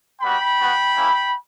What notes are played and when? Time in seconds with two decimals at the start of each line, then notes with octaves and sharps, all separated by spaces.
0.22 G3 B3 F#4 G5 B5
0.58 B3 F#4
0.94 A#3 C#4 E4